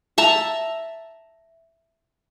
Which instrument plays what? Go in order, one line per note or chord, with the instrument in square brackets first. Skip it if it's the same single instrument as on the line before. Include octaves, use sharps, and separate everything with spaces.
[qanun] E5 A5 A#5